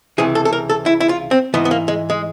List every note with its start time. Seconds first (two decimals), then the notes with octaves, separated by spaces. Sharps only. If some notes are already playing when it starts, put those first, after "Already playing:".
0.18 C#2 C3 E3 G#4
0.35 A4
0.45 A4
0.53 A#4
0.69 A4
0.86 E4
1.00 E4
1.09 F4
1.31 C4
1.54 G#2 E3 B3
1.65 B3
1.71 A#3
1.88 G#3
2.10 G#3